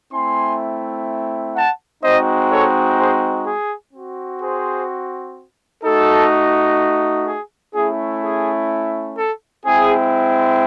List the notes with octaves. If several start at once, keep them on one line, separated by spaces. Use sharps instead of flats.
A3 C4 E4 G#5 C6
F#5 A5
G#3 C4 D#4 F#4 C5 D#5
A4 C#5
G#4 C5
G#4
C4 F#4
G#4 C5
A3 D#4 F#4 A4
G#4
A3 C#4 E4 G#4
G#4
A4
G#3 C4 E4 G#4